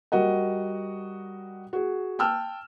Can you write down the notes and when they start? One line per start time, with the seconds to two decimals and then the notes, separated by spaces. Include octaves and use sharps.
0.12 G3 F#4 A#4 D#5 F#5
1.73 F#4 G#4
2.19 G5 A5 E6 F6